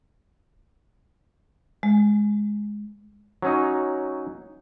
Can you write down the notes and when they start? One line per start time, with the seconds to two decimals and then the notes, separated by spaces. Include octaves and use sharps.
1.83 G#3
3.42 F#3 C#4 D#4